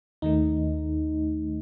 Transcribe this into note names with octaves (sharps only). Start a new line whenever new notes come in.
D#2 D#3 A3 D#4